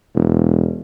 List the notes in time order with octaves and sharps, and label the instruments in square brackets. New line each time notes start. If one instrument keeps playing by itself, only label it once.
[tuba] E1